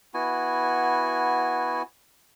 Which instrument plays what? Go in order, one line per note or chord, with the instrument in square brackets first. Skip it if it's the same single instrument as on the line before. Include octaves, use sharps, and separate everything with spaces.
[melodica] B3 E4 F#4 G#5